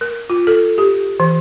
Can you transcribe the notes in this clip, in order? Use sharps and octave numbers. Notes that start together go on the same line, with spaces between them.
A#4
F4
A4
G4
E3